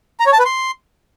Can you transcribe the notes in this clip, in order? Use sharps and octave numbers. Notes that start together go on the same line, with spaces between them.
A#5
C#5
A5
B4
C6